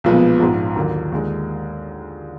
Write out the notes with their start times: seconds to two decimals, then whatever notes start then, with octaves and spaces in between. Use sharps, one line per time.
0.04 B1 A#2 F3 G#3 B3
0.39 A#1 G#2 F3
0.76 D#2 D3 F#3 A#3
1.12 D#2 D3 G#3